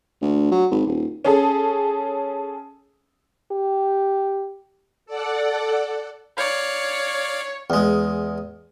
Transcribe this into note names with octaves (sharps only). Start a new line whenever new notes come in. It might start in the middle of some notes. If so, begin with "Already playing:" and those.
D2
F#3
G#1
D#1
C#4 G#4 A4
G4
A4 D5 F#5
C#5 D5 F5
E2 G#3